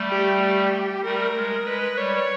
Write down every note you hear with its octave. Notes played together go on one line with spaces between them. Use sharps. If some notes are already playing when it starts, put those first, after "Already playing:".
Already playing: G3 A3
G4
G4
G3 A3 A#4
G#3
G#3 B4
G3 C#5